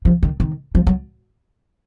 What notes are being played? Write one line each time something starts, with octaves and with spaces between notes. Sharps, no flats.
F3
D#3
D#3
F3
F#3